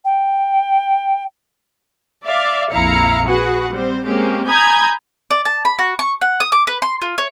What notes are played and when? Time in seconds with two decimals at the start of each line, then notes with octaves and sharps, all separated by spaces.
0.04 G5
2.25 D5 E5 F5
2.71 A#1 F2 E4 F5 A#5 C#7
3.26 F#4 G#4 B4 F#5
3.72 G3 C4 C5
4.05 G#3 A#3 C4 C#4 G4
4.48 G#5 A#5 B5 D#6 G6 G#6
5.31 D5
5.45 A5
5.65 B5
5.79 F#4
5.99 C#6
6.21 F#5
6.40 D#6
6.52 D6
6.67 B4
6.82 C6
7.02 F4
7.18 C#5